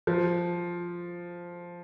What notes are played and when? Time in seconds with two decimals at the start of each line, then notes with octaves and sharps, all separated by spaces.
0.07 F3